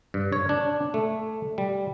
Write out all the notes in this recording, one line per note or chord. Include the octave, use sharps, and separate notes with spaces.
G2
C#5
D4
A3
G3